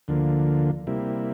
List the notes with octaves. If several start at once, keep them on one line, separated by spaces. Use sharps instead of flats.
D2 D3 F3 A#3
C3 G3 A#3 E4